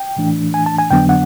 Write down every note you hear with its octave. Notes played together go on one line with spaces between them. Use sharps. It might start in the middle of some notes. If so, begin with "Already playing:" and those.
Already playing: G5
A2 E3 A3 D4
G#5
A5
G#5
F2 D3 F#3 B3 D4 G5
F#5